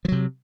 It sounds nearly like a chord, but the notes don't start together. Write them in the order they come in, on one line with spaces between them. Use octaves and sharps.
F3 F#3 C3